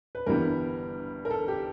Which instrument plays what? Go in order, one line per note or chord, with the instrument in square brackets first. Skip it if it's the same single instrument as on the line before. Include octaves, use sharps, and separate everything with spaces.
[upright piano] B4
G1 G2 E3 G3 B3 A#4
A#4
A4
G4